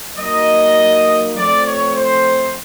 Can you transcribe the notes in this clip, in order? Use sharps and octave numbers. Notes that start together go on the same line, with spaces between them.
F#3 A#3 D#4 D#5
F3 A3 C4 D5
C#5
C5